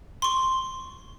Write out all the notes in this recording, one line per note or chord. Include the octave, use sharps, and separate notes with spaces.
C6 C#6